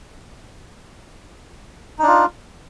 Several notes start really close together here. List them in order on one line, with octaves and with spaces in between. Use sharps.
D#4 D4 F4